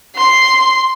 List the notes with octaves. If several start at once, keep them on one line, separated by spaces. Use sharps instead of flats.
C6